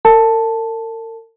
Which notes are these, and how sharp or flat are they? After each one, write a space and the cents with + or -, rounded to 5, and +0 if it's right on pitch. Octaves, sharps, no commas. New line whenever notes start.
A#4 -45 A5 +0